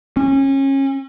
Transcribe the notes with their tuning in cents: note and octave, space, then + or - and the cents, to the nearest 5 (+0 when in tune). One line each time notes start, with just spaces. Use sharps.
C#4 -30